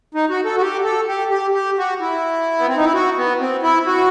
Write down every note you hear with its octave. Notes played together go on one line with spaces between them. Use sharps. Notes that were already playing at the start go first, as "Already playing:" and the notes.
D#4
F#4
A4
F#4
G4
A4
G4
G4
G4
F#4
E4
B3
C4
D#4
E4
F#4
B3
C4
E4
F#4